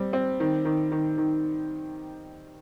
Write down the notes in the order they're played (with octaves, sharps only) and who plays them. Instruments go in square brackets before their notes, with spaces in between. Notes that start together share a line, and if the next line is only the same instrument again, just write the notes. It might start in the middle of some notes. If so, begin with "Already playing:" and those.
Already playing: [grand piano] G3 C4
C4
D#3
D#3
D#3
D#3